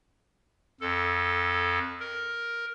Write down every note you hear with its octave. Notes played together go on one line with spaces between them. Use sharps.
F2 A4
A#4